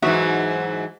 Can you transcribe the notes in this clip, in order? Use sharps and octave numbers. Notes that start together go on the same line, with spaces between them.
G#2 E3 F#3 D#4 F#4 E5